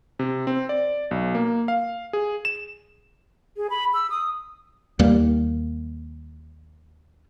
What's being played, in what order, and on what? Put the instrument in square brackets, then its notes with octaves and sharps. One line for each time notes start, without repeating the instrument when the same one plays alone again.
[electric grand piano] C3
C4
D5
B1
A#3
F5
G#4
E7
[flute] G#4
B5
E6
D#6
[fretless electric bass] D#2 G3 A#3